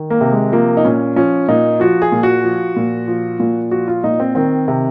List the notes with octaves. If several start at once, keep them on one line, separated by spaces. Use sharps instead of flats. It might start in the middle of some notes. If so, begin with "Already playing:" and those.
Already playing: D#3
A#3
C3
G#3
F3 A#3
D#4
A#2 C#4
F3 C#4
A#2 D#4
F3 F#4
G#4
A#2
F#4
F3
A#2
F3
A#2
F3 F#4
F4
A#2 D#4
C4
D#3 C4
C3